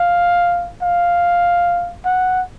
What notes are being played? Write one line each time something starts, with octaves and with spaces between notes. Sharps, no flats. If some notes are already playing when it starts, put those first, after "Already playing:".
Already playing: F5
F5
F#5